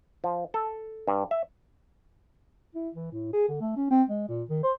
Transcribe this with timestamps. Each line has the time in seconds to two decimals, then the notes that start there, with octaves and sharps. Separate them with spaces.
0.24 F3
0.54 A4
1.08 G2
1.31 E5
2.75 E4
2.94 E3
3.12 A2
3.33 G#4
3.48 D3
3.61 A3
3.77 C#4
3.90 C4
4.09 G#3
4.28 A#2
4.49 D#3
4.63 C5